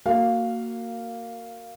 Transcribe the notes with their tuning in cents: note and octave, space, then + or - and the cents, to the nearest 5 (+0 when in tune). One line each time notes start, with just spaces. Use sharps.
A#3 -15 F#4 +0 F5 +0